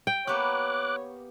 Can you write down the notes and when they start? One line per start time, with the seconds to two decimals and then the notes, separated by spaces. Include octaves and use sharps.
0.07 G5
0.27 A#3 B3 G4 C#5 D6 F#6